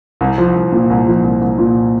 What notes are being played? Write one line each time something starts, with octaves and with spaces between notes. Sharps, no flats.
C2
F3
C2
A#2
C2
F3
C2
C2
A#2